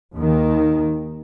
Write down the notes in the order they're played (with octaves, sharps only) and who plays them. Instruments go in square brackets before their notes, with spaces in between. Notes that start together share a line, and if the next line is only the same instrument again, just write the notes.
[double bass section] D#2 D#3